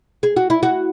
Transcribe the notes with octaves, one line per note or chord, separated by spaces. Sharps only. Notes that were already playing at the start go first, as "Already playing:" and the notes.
G#4
F#4
E4
F#4